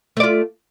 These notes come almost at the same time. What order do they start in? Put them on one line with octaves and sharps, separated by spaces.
A3 D5 F4